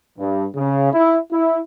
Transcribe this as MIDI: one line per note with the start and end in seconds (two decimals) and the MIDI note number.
0.19 0.46 43
0.55 0.90 49
0.93 1.18 64
1.32 1.58 64